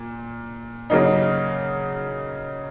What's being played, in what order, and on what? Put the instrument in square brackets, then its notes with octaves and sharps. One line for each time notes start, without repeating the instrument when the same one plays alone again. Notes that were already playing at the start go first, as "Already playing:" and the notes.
Already playing: [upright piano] A#2
C#3 F#3 A#3 D#4